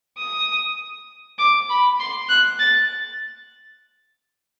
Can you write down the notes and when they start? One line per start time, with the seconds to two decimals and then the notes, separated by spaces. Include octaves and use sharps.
0.18 D#6
1.39 D6
1.70 B5
2.00 C6
2.29 F#6
2.59 A6